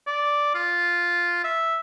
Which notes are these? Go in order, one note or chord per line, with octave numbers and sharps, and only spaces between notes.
D5
F4
E5